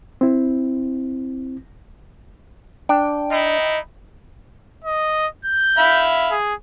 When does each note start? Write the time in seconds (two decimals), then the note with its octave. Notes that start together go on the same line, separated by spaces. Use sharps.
0.21 C4 E4
2.89 D4 G5
3.30 D#4 E4 D#5
4.84 D#5
5.45 G6
5.78 E5 F5 B5
6.31 G#4